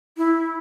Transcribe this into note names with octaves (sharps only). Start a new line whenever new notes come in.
E4